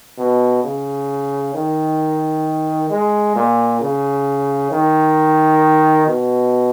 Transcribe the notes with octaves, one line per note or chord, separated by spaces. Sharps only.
B2
C#3
D#3
G#3
A#2
C#3
D#3
B2